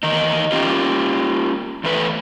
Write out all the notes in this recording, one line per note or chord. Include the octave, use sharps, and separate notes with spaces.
E2 D#3 D#4
C#4 F4 G4
E2 A3 B4